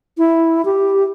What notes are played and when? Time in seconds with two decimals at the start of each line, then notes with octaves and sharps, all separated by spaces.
0.18 E4
0.65 G4